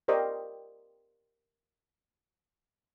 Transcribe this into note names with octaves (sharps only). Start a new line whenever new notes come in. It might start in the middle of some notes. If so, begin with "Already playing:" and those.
G4 A#4 C5 D5 D#5 G5